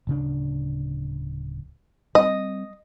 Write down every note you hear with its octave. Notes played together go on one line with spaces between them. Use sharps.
D1 C#3 D4
G3 C4 D#5